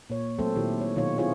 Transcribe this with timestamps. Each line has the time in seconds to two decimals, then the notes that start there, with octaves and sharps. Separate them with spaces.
0.10 A#2 C#5
0.38 F#3 A3 C4 A4 C5
0.55 A#2 D#3 E4 G4
0.81 C#5
0.96 B2 D#3 F#3 D#4 F4 C#5
1.18 B3 C4 E4 F4 G#4 C#5